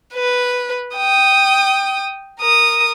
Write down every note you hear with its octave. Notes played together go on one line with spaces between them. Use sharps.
B4
G5 D#6
A#4 D#6